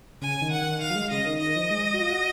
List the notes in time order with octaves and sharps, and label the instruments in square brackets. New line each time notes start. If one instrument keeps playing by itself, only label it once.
[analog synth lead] C#3 [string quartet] G#5
[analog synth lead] D#3
[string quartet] F#5
[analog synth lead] D#3
[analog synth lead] D#3 [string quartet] F5
[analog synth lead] F#3
G#3
[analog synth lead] C#3 [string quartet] D#5
[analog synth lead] D#3
[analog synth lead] D#3 [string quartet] D#5
[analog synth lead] F3
G#3
F#4
F4
F#4